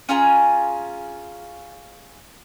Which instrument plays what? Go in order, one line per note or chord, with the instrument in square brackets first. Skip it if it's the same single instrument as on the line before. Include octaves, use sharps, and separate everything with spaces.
[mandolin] C#4 F4 G#4 A#5